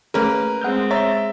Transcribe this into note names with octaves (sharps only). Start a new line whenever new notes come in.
A3 A#3 C#4 G#4 A#4 B4
G#3 C4 F#5 F6 G6
C#5 E5 A#5 A6